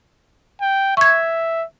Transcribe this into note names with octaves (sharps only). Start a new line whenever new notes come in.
G5
E5 C#6 G#6